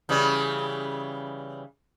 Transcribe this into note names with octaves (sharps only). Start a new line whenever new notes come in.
C#3 E3 G3